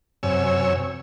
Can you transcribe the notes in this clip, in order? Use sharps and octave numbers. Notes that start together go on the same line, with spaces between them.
F#2 C3 C#5 G#5 E6